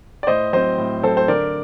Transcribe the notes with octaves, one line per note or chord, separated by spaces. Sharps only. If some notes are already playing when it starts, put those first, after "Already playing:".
D5
A2 C5 D#5
F#3 C4 C5 D#5
A2
F#3 C4 A4 C5
C5
D3 A#4 D5